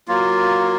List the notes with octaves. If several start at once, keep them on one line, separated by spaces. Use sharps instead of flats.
F#3 A#3 F4